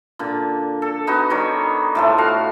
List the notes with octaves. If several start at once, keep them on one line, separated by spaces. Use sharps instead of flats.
A#2 D3
A4
B3 D#4 F#4
D#3 G3 C#5
A2 F3 A3
F#4 F5